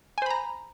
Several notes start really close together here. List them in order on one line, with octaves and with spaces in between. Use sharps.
G#5 C5 B5 A#5